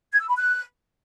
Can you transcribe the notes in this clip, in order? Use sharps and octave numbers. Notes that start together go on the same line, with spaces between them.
G#6
E6
B5
F#6